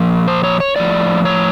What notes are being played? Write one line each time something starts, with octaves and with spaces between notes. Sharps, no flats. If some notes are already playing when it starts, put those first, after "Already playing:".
Already playing: A#2 F3
C5
C#5
C#5
A2 F3 D5
C#5